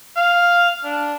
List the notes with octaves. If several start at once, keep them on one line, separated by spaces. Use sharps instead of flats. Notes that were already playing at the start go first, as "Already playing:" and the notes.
F5
D4